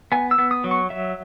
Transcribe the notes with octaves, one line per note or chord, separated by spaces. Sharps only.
B3 G#5
E6
B3
D#6
F#3
C#6
F#3 E5